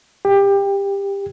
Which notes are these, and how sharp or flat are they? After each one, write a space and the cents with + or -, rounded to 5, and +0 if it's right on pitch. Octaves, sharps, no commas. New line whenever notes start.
G4 +20